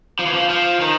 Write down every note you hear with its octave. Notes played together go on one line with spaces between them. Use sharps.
F3
E3
F3
F3
D#3